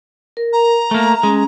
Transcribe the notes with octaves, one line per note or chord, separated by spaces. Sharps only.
A#4
A#5
A3 A#3 E5
G#3 C#4